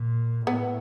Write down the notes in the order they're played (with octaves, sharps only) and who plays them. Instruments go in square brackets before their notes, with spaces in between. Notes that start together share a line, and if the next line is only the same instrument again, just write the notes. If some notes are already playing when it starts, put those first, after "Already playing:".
Already playing: [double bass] A#2
[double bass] A2 [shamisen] B3